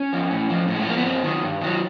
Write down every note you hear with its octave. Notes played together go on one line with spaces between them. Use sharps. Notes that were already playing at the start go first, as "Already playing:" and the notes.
Already playing: C#4
F3
A2
F3
A2
G#3
A3
F3 A#3
B3
G2 C4
D#3 F#3
G2
D#3 F#3